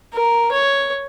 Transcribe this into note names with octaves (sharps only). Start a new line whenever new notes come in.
A#4
C#5